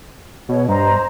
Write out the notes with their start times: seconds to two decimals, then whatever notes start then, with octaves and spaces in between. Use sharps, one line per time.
0.49 B2 G#4 C#5
0.68 G2 C5 D#5 A#5